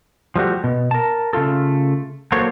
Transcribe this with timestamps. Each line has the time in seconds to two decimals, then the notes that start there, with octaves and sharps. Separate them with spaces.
0.36 F3 G3 A3 F#4 G4
0.64 B2
0.91 A#4 A5
1.33 C#3 A3 F4 A4
2.32 F#3 A#3 A4 C5 C#5